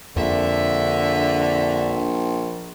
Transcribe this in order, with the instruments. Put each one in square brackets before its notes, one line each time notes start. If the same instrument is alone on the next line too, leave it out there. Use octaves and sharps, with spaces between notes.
[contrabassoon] A#1 [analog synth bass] F2 [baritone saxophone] D3 [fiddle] E5